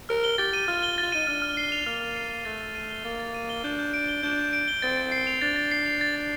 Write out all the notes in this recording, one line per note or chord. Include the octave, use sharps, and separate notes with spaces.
A#4 F6
G7
G4 A6
D#7
F4 F6
G7
F4 A6
D#4 D#7
D4 F6
F6
C7
F7
A#3 F6
F6
C7
F7
A3 A6
A6
D#7
G7
A#3 A6
A6
D#7
G7
D4 G6
G6
D7
G7
D4 G6
G6
D7
G7
C4 A6
A6
C7
F7
D4 A6
A6
C7
F7
A6
A6